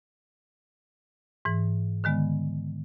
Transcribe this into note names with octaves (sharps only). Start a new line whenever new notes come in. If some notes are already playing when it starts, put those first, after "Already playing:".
G#2 E3
D3 D#3 G#3 B3